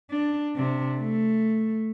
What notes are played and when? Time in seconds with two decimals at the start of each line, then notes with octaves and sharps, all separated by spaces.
0.10 D4
0.56 C3 D4
0.97 A3